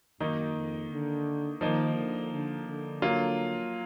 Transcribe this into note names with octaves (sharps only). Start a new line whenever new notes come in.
F#2 D#3 A#3 D#4
F2
D3
D#3 F3 A#3 D#4
D3
D3
D3
F#3 A#3 F4